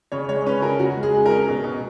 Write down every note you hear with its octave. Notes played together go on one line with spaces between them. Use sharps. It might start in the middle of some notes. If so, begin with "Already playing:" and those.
C#3 C#5
G#3 C#5
C#4 B4
C#3 A#4
C#3 F#4
G#3
G#4
G#3
C#4 A#4
B2
B2